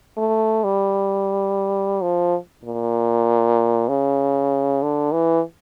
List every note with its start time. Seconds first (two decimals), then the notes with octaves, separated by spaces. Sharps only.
0.17 A3
0.64 G3
2.03 F3
2.65 A#2
3.88 C#3
4.82 D3
5.13 E3